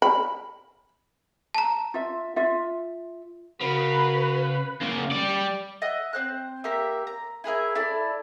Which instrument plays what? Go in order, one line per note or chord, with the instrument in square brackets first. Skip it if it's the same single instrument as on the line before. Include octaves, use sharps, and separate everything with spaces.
[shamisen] B5
[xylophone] A5 A#5
[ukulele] F4 E5
F4 E5
[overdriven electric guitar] C#3 [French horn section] F#4 A#4 [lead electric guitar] B4
[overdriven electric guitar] C#3 A#3
G3 D5
[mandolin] D#5 E5 F#5
C4 C5 F#6
A#3 G4 A#4 E5
A#5
E4 G#4 A#4 E5
E4 A4 D5